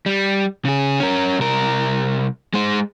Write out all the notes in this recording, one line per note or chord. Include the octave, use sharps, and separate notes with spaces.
G3
C#3 G#4
C#4 A#4
C2 A#4
G#3 C5